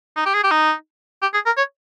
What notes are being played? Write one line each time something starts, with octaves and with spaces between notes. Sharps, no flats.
D#4
G4
G#4
G4
D#4
G4
G#4
A#4
C#5